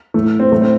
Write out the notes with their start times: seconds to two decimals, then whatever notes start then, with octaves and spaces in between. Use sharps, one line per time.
0.14 A2 E3 A3
0.40 C4
0.52 A2 E3 A3
0.62 C4